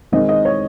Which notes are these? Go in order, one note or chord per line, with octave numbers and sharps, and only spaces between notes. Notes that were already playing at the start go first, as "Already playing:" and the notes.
D#3 G#3 C4 D#5
D#5
C#5